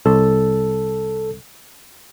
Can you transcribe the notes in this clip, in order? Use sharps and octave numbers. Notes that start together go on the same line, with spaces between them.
C2 A4